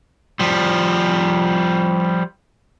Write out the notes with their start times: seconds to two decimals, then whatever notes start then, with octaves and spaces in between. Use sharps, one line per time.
0.40 F3 G3